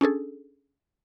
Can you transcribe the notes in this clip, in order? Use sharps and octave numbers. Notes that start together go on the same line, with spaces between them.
C#4 D4 G#4 A4